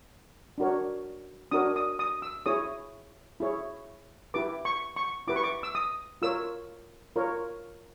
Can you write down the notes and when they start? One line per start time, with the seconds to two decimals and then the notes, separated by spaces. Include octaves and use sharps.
0.58 D4 F#4 A#4 C#5
1.51 D4 F#4 A#4 C#5 D#6
1.76 D#6
1.99 D#6
2.22 E6
2.46 E4 G#4 C#5 D#6
3.40 E4 G#4 C#5
4.34 E4 G4 B4 D6
4.65 C#6
4.96 C#6
5.27 E4 G4 B4 D6
5.36 C#6
5.43 D6
5.63 E6
5.75 D#6
6.22 F4 A#4 C#5 E6
7.16 F4 A#4 C#5